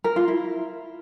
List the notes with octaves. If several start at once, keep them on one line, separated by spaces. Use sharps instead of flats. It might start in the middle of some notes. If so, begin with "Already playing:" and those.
A#4
F4
E4